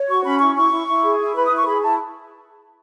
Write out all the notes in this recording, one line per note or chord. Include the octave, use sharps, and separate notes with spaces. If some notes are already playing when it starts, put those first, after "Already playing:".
Already playing: C#5
F#4 C#6
C#4 B5
E4 C#6
E4 C#6
E4
E4
G#4
E4
B4 B5
D#6
E4
C#6
G#4 B5
E4 A5